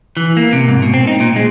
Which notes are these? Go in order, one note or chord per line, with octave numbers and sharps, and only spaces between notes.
E3
A#3
C3
G#2
B2
C4
D#4
A#2
G#3